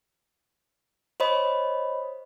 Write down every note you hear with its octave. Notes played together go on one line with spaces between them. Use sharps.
C5 C#5 D#5 B5